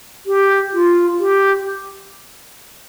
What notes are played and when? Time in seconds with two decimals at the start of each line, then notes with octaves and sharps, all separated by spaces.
0.26 G4
0.73 F4
1.19 G4